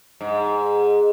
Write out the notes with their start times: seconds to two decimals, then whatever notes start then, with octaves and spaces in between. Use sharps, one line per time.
0.21 G#2